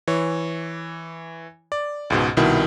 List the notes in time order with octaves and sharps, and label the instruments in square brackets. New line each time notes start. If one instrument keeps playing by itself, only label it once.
[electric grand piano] E3 C#5
D5
C#2 G#2 B2
C2 B2 D#3 E4